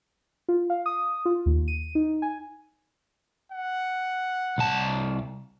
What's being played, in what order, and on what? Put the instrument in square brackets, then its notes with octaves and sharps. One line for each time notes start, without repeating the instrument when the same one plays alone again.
[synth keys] F4
F5
D#6
F4
D#2
D#7
D#4
G#5
[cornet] F#5
[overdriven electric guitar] C2 A5